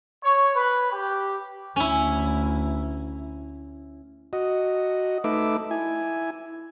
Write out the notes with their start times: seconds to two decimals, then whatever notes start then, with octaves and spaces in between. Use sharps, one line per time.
0.24 C#5
0.56 B4
0.92 G4
1.76 D2 C#4 E4
4.33 F#4 D#5
5.24 A3 D#4 B4 E5 D6
5.71 E4 G#5